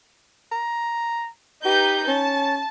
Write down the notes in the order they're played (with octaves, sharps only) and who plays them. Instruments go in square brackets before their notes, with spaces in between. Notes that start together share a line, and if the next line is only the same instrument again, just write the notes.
[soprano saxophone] A#5
[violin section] D#4 B4 G6 [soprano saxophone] G4
[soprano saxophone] C#4 [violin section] A5